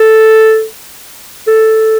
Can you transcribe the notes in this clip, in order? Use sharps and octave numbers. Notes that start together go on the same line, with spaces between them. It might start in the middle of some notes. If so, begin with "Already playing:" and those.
Already playing: A4
A4